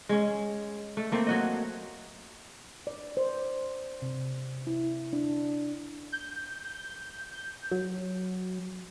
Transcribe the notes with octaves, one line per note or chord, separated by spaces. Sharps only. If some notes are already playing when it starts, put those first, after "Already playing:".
G#3 C#4
A3
A3 A#3 C4
F#3 F#4 D#5
D5
C5
C3
E4
D4
G6
F#3